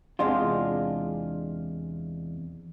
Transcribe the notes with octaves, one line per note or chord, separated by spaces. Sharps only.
E2 C3 G#3 D4 F4